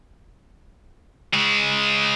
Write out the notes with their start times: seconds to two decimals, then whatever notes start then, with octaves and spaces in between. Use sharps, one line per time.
1.34 C#3 G#3